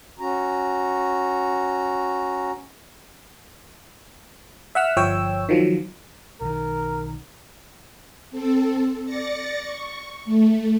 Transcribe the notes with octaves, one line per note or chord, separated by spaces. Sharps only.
C#4 F#4 A#5
E5 F#5 E6 F6
G1 F3 C#5 G5 E6
D#3 F3 F#3
B1 D#3 A#4
C4 A4
D5 A6 A#6 C#7
C#6
A3